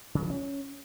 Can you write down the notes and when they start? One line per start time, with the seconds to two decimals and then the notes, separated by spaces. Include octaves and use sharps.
0.15 C#3
0.22 F3
0.30 C#4